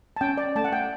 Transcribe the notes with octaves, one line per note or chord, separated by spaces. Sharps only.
A5
C#4 G5
D5
A3 A5
F#5
G5